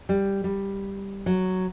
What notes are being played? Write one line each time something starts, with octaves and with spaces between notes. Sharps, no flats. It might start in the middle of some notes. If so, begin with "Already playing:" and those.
G3
G3
F#3